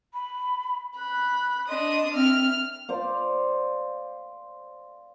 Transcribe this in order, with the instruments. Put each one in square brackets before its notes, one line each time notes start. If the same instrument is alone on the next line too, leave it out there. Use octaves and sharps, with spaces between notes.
[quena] B5
[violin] B5 [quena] F#6
[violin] D4 D#6 [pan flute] D#5 [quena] C6
[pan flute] C4 [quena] E5 [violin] F6
[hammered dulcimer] C5 D5 F5